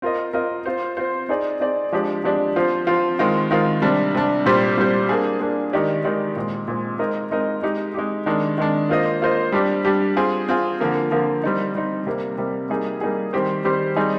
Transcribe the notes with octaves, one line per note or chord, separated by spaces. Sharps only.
C4 F4 A#4 D#5
C4 F4 A#4 D#5
C4 F4 C5
C4 F4 C5
C4 D#4 G#4 D5
C4 D#4 G#4 D5
F3 G#3 D4 G4 D5
F3 G#3 D4 G4 D5
F3 C4 F4 C5
F3 C4 F4 C5
D#3 G#3 C4 F4
D#3 G#3 C4 F4
C3 G3 D4
C3 G3 D4
A#2 G3 C4 G4 C5
A#2 G3 C4 G4 C5
A#3 D4 G#4
A#3 D4 G#4
D#3 G#3 D#4 G4 D5
D#3 G#3 D#4 G4 D5
A#2 G#3 C4
A#2 G#3 C4
G#3 C4 D#4 A#4 D#5
G#3 C4 D#4 A#4 D#5
G#3 D#4 G4
G#3 D#4 G4
D#3 G#3 D4
D#3 G#3 D4
A#3 F4 C5 D#5
A#3 F4 C5 D#5
G3 D4 G4
G3 D4 G4
C4 F4 G#4
C4 F4 G#4
D3 F3 A#3 F4 A#4
D3 F3 A#3 F4 A#4
G3 C4 D#4
G3 C4 D#4
C3 G3 A#3
C3 G3 A#3
G3 A#3 D#4 G#4
G3 A#3 D#4 G#4
D#3 G3 C4 G4 C5
D#3 G3 C4 G4 C5
G3 C4 D#4 G#4